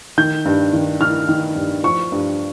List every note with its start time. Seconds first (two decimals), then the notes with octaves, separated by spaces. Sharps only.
0.18 D#3 G6
0.45 G2
0.73 D#3
1.00 D#3 F6
1.29 D#3
1.56 G2
1.84 F3 C#6
2.12 G2